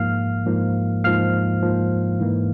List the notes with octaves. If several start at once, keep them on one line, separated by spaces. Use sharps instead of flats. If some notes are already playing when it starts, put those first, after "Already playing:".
Already playing: G#2 F3 A#3 F5 F6
G#2 F3 A#3
G#2 F3 A#3 F5 F6
G#2 F3 A#3
G#2 E3 A#3